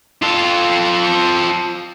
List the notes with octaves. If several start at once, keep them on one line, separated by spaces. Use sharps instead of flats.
F4 A4